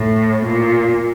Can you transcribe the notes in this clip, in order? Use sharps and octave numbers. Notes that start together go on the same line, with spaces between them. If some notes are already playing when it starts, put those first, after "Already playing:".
Already playing: A2
A#2